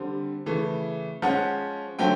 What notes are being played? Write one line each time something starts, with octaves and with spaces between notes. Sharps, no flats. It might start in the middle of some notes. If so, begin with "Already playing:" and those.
Already playing: D3 G3 C4
C#3 E3 A3
F3 G#3 C#4 F#5
D3 F#3 A3 C4 G5